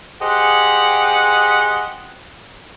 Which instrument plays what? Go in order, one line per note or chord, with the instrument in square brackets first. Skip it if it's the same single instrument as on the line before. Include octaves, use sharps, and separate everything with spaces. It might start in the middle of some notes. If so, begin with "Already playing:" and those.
[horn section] G4 G#4 C5 D#5 F#5